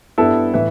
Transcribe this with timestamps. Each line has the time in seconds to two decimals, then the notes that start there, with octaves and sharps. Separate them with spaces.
0.18 G2 G3 B3 E4 A4
0.53 A2 E3 B4 E5